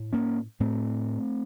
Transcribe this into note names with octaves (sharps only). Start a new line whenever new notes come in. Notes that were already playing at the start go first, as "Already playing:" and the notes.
Already playing: A2
A#3 C#4
A2 A3 C4